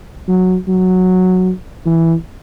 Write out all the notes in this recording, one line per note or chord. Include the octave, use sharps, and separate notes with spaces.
F#3
F#3
E3